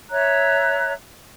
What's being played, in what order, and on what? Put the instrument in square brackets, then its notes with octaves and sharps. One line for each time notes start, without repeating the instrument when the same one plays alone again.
[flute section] C#5 E5 A#5 F#6